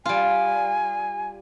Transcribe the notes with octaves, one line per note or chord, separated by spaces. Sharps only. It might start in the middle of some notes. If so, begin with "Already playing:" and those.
G3 F4 G#5